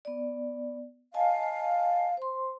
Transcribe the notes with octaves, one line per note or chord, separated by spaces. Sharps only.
B3 D5
D#5 F5 G#5 A5
C5 C6